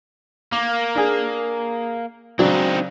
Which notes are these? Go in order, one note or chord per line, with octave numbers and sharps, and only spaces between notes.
A#3 D6
D4 G#4
C#3 F#3 C4 D4 D#4